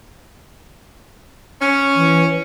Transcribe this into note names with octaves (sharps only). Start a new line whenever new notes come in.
C#4
E3